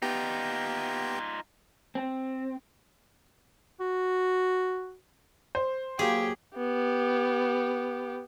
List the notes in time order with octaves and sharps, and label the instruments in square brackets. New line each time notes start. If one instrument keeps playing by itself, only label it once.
[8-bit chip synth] B3 G4 G5 [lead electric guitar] D#4 F4
[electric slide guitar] C4
[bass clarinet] F#4
[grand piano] C5
[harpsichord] F#3 A#3 C#5 [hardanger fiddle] G4 [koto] G#4
[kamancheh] B3 G4